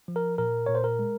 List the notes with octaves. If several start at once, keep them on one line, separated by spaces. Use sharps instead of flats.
F3
A#4
A#2 A#4
A#2 C#5
C5
A#4
G#3